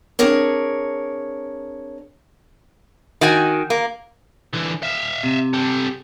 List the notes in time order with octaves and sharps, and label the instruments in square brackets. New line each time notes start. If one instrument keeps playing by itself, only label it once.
[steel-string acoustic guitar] C4 D4 G#4 A#4 C#5
[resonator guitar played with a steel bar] D#3 F#4 G#5
A#3
[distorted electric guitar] D3 E3
E5 F5
[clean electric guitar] C3
[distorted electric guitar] G4 A4